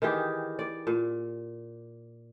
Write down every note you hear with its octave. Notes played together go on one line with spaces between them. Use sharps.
D#3 E3 G4 G#4
D5
A#2